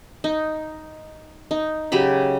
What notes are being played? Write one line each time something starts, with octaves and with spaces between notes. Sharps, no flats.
D#4
D#4
C#3 F#3 G4 B5